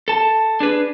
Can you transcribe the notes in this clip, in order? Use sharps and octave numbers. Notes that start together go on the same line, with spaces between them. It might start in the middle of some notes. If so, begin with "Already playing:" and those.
A4 A5
D4 G#4 B4